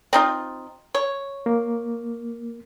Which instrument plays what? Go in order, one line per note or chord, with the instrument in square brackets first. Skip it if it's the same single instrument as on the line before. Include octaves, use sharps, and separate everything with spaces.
[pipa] C4 D#4 F4
C#5
[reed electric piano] A#3